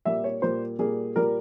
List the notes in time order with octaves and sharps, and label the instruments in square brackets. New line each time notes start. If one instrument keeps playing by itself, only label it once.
[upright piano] A#2 G3 A#3 E5
C#5
A#2 G3 A#3 C5
A#2 G3 A#3 G#4
A#2 G3 A#3 A#4